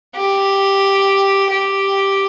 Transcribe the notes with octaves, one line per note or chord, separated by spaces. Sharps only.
G4
G4